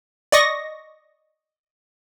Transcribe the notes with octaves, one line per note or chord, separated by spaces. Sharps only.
D5 D#5 C#6 A#6